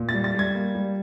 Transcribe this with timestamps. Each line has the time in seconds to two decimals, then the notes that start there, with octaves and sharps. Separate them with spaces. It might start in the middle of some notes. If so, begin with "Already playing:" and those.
Already playing: A#2
0.09 A6
0.14 G3
0.24 A6
0.34 G3 G#6
0.55 A#3
0.75 G3